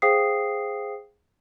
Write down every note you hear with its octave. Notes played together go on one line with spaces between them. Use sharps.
G#4 C5 F5 G5 D#6 C7